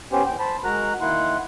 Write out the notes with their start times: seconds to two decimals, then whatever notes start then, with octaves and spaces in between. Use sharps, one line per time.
0.12 B3 C#4 G4 C5
0.26 E2 G5
0.40 C5 A5 B5
0.64 G#3 F#4 A#4 A#5 F#6
1.01 D#3 A#3 E4 F#5 C6 F#6